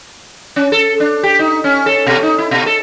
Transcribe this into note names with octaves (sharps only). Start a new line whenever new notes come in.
C#4
A4
D4
G4
D#4
C#4
A4
B2
D#4
E4
B2
A4